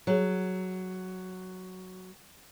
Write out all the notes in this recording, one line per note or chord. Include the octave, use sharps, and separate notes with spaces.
F#3 G#4 C#5